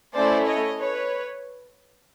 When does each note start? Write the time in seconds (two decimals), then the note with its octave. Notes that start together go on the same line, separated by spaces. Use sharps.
0.14 A3 C#4 E4 A4 C5 D5
0.47 C#5 D#5
0.79 B4 C#5